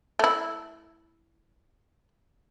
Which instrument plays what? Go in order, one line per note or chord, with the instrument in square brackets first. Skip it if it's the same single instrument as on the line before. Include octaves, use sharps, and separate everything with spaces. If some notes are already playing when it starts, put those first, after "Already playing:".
[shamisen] A3 E4